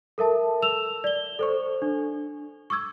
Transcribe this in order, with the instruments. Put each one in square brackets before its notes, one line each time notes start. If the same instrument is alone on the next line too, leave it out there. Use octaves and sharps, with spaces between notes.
[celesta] A4 A#4 E5 A5
E6 E7 F7
D5 G7
A4 C5 C#6
D4
C#6 D6 E6 G#6